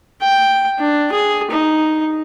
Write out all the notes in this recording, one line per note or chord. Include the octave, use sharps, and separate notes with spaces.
G5
D4
G#4
D#4